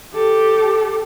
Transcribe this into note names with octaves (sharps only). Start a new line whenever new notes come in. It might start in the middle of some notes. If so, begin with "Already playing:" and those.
G4 A4